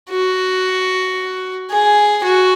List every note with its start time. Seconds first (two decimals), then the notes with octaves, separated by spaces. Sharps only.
0.10 F#4
1.70 G#4
2.24 F#4